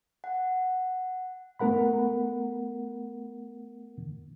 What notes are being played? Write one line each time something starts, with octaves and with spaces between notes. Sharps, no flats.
F#5
A3 B3 A#4 F#5 B5